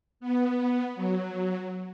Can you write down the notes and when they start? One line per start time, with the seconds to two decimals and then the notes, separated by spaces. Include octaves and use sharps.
0.20 B3
0.96 F#3